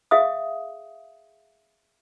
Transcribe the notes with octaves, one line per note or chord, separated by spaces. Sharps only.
G#4 E5 F5 D#6